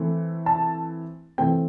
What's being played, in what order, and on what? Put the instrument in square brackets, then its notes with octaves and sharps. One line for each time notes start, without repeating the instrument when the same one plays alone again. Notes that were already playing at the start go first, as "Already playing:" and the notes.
Already playing: [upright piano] E3 A3 C4
A5
E3 A3 C4 G5